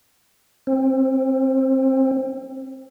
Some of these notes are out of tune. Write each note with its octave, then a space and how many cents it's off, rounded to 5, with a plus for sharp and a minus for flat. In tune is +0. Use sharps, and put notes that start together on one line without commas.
C4 +20